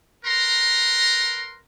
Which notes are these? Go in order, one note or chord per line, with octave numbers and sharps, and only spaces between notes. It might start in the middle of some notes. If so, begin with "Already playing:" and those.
A#4 B4 A#5 C6